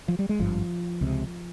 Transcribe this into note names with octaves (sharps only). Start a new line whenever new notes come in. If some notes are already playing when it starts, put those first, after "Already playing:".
F3
G3
G#3
G#1 G2 F3
C#2 C3